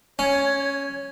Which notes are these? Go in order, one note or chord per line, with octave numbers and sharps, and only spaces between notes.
C#4 C#5 G#6